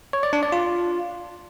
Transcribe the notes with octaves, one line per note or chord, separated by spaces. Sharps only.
C#5
D5
D4
D5
F4